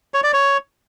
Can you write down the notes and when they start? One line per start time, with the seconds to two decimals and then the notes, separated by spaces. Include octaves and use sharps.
0.14 C#5
0.24 D5
0.33 C#5